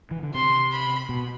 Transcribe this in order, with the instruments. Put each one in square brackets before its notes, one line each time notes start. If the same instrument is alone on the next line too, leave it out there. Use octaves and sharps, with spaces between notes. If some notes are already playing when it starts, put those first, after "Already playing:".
[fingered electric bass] E3
D3
[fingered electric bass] C3 [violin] C6
[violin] B5
[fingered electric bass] B2